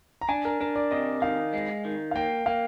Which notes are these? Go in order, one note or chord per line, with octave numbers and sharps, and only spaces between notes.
A#5
D4 G#5
A#4
D4 A#4
D5
C3 D#5
D#3 F5
G#3
D#3
F5
A#3 G5
A#3 F5